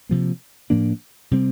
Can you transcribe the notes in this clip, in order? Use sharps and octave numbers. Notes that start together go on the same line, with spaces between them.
C3 F3 A#3
A2 F3 A#3 D4
C3 G3 C4